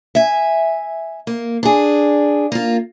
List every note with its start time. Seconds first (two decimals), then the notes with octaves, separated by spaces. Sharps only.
0.15 E5 G#5
1.27 A#3
1.63 D4 G#4
2.52 A#3 F4